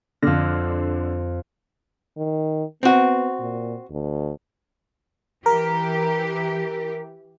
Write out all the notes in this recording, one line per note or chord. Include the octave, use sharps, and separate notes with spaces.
F2 D3 F6 A#6
D#3
B3 C4 F#4
A#2
D2
E3 G4 A#4